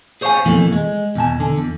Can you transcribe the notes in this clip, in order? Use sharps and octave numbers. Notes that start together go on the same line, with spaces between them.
G#4 C5 C#5 D#5 F5 G#5
F2 B2 E3 A3 A#3
G#3
E2 B2 G#5 A5
D3
E2